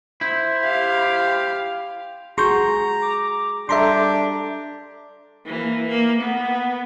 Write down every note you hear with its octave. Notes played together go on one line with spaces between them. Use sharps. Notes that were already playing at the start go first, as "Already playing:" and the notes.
E4 C5
G4 F5
F#4 G#4 A#5 C6 C#6 G6
D6
G3 D4 G4 A4 E5 A#5 C6
E3 A#3
A#3
B3